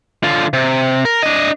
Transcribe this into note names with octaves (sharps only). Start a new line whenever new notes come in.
D3 F4
C3
A#4
D4 D#5